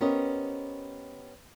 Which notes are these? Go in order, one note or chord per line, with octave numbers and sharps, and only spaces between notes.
B3 C#4 G4 A#4 C5 D#5